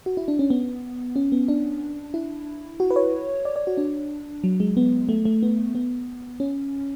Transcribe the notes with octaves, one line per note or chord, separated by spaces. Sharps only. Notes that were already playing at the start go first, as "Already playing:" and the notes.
F#4
E4
D4
C#4
B3
C#4
B3
D4
E4
F#4
B4
C#5
D5
D5
F#4
D4
F#3
G#3
B3
A3
A3
B3
B3
C#4